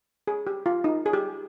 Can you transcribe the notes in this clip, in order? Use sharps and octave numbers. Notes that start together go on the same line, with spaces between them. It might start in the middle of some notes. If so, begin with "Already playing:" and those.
G#4
G4
F4
D#4
G#4
G4